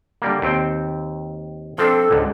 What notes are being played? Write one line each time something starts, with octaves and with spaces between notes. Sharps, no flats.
D3 G3 A#3
D#2 C4 G5
F3 C4 D4 A4
C#2 G#2 D3